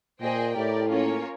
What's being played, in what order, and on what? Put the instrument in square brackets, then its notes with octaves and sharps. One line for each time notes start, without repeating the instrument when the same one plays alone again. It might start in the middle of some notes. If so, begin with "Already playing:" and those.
[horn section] A#2 [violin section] G#4 C5 D#5 G5
[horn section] A2 [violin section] G4 A#4 D5
[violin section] A#3 C#4 F4 A#4 C#5